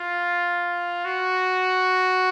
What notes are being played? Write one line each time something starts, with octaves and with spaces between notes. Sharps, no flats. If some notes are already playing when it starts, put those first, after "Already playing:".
Already playing: F4
F#4